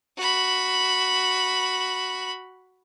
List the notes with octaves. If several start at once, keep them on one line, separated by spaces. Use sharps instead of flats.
F#4 B5